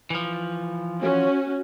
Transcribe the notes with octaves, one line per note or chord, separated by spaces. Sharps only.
E3 F3
C#4 F#4